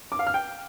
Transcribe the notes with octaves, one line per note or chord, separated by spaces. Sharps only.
D6
F5
F6
G5